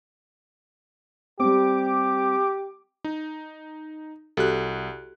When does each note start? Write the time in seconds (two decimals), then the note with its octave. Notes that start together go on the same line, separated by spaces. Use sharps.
1.40 G3 C4 G4 D6
3.04 D#4
4.37 C2 F#4 G4 A4 F#6